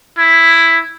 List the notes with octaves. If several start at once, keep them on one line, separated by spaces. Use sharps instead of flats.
E4